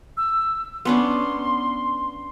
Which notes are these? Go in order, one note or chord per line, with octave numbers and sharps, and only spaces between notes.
E6
B3 C#4 D4 C6